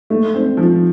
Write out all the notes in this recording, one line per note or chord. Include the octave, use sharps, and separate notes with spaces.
A3
C4
F3